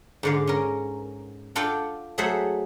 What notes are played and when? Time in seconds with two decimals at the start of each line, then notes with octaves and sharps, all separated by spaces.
0.23 G#2 D3 F5
0.47 C#4 A#4
1.55 D4 F4 A4 F#5 G5
2.18 F#3 A3 G#4 C5 E5 F#5